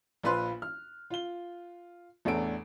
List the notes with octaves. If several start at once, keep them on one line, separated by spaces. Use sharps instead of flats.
A#1 A#2 F4 B4 C6 F#6
F6
F4 G7
A1 E2 D4 A4 D7